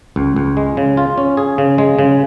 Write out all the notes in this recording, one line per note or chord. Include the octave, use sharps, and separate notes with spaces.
C#2
C#2
G#3
C#3
F4
C#4
G#4
C#3
G#3
C#3